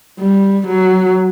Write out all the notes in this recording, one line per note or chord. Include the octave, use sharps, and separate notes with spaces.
G3
F#3